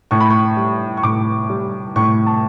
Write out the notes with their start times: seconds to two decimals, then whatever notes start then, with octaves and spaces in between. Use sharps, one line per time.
0.11 A2 C#6
0.20 B5
0.30 C#6
0.57 G3
0.97 C#6
1.03 A2 D6
1.50 G3
1.96 A2 C#6
2.27 A5